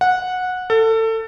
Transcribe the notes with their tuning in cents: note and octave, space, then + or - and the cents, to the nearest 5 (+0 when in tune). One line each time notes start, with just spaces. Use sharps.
F#5 -15
A4 +25